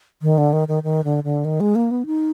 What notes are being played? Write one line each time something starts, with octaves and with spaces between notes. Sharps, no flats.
D#3
D3
D#3
D#3
D#3
D3
D3
D#3
G#3
A#3
B3
D#4